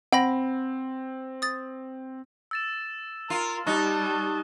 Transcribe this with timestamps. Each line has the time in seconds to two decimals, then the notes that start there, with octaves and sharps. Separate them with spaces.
0.13 C4 F#5 G5 B5 A#6
1.42 D#6 A6
2.51 E6 A6 E7
3.30 F4 A#4
3.67 G3 D#4 A5 C#6 F#6 G7